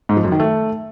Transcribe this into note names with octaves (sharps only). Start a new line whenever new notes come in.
G#2
F3
F#2
D#3
A3